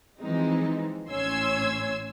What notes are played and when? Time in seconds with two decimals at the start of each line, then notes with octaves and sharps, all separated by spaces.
0.20 E3 F3 G#3 C4 D#4
1.09 A1 A2 C#4 C6 E6 G#6